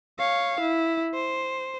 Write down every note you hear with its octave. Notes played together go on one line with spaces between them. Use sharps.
C#5 F5
E4
C5